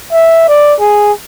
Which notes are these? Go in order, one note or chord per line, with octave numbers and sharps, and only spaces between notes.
E5
D5
G#4